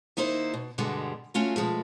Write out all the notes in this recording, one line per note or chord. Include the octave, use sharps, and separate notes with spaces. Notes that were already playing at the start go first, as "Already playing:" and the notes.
D#3 A#3 D#4 E4 C5
B2
G2 B2 D3 G3 G#3
A3 C#4 F4 F#4
B2 F3 G#3 A3